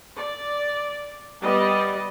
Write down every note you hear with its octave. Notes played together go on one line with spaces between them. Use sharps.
D5
G3 B3 D5 D#5